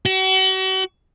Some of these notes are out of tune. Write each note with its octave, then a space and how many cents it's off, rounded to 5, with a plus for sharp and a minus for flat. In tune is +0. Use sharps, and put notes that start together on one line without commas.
F#4 +40